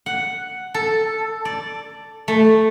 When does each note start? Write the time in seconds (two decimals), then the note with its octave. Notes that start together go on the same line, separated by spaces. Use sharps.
0.06 F#5
0.74 A4
1.45 D5
2.28 A3